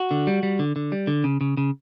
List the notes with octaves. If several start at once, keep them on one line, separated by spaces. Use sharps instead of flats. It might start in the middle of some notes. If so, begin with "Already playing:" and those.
Already playing: F#4
D3
G3
G3
D3
D3
G3
D3
C#3
C#3
C#3